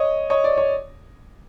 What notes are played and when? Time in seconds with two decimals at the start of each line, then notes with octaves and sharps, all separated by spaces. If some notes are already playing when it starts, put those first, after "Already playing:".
Already playing: C#5 D#5
0.30 C#5 D#5
0.44 D5
0.57 C#5